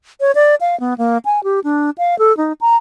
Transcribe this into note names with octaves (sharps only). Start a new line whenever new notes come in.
C#5
D5
F5
B3
A#3
G#5
G4
D4
F5
A4
D#4
A#5